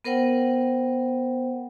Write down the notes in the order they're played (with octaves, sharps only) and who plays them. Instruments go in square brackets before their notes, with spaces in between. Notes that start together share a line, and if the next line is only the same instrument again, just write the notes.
[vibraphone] B3 A#4 C5 F#5 G5